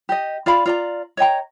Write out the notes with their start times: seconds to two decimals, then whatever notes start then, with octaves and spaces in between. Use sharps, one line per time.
0.09 G4 D#5
0.46 F4 D5 F5 B5
0.66 F4 D5 A#5
1.17 C#5 D#5 G5 A#5